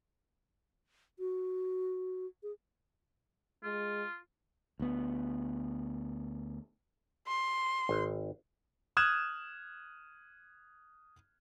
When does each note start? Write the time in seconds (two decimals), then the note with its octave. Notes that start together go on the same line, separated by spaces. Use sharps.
1.19 F#4
2.43 G#4
3.64 G#3 F4
4.80 D2 B3
7.27 C6
7.89 G#1
8.97 D#6 F6 F#6 G#6 E7